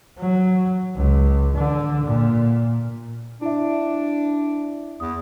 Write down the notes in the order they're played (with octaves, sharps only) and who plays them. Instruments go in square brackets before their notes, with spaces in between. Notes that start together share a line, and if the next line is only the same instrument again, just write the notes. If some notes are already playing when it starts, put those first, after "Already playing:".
[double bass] F#3
C#2
D3
A#2
[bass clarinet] D4 [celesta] E4 E5
[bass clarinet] E2 [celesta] D#6